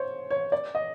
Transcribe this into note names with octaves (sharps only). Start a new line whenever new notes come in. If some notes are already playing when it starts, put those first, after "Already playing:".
Already playing: C5 C#5
C#5
D5
D#5